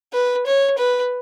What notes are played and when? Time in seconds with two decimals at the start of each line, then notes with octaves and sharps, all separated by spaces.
0.13 B4
0.46 C#5
0.78 B4